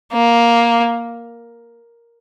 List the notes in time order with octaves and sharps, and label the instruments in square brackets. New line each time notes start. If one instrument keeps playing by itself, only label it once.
[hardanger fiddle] A#3